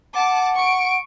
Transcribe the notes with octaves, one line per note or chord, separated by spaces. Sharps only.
F#5 A5 D6
C#6 D7